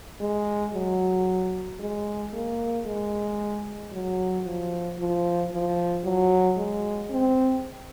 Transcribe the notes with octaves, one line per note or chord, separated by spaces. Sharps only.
G#3
F#3
G#3
A#3
G#3
F#3
F3
F3
F3
F#3
G#3
C4